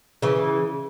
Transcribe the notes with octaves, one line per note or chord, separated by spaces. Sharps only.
C#3 E3